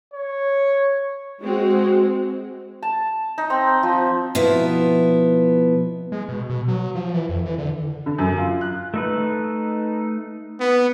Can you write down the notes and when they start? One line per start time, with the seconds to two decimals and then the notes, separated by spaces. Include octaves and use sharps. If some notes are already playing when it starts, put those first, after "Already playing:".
0.13 C#5
1.41 G#3 C4 F#4
2.83 A5
3.38 D#4
3.50 C4
3.83 F3
4.35 B2 F3 B3 E4
6.12 G#3
6.29 B2
6.50 B2
6.68 F#3
6.95 F3
7.14 E3
7.29 F2
7.46 E3
7.58 D3
8.06 D3
8.18 F#2
8.38 F4
8.61 F#6
8.94 A3 D#4 B4
10.60 B3